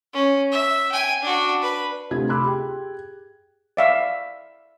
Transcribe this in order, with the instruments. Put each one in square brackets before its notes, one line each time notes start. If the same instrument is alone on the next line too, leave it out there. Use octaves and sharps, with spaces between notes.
[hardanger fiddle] C#4
E5
G5 G#5
D4 F#4
B4
[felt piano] D2 C3 F4 G4 G#6
B5 C6 D6 E6 F#6
G4 G#4 G5
[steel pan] D5 E5 F5